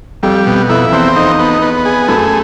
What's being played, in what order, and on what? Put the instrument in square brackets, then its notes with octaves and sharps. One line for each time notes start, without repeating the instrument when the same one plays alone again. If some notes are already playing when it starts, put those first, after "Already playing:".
[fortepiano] F2 [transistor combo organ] G3
[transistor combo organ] B2
[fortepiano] F2 [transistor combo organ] E4
[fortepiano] E2 [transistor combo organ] C4
[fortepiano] F2 [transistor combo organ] D#4
[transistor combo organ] B3
B3
G#4
[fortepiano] F#2 [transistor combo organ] A3